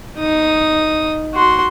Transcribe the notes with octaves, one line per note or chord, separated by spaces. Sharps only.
D#4 D#6
F#4 C6